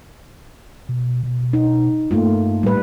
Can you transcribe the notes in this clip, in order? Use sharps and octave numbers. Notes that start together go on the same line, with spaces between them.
B2
B2
D#4
G2 A3 A#3 F4
A2 G3 B4